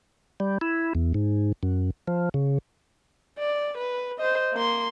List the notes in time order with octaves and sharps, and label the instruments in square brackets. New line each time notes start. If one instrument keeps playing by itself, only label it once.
[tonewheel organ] G3
E4
E2
G#2
F#2
F3
C#3
[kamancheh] D5
B4
C5 D#5
A#3 C6